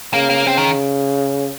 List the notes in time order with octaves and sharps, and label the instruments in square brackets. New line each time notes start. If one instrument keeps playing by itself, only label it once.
[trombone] C#3 [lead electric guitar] A#3
[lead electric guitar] A#3
[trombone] C#3 [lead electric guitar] C4
[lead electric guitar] D#3